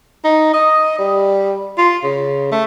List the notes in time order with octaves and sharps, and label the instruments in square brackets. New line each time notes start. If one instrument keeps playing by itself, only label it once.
[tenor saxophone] D#4
D#5
G3
F4
C#3
A3